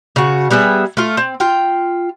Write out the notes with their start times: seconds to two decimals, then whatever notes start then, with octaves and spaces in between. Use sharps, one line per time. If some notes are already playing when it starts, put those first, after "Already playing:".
0.16 C#3 F#4
0.51 G3 B3 G#4 E5
0.97 A3 F4
1.17 C4
1.40 F4 G5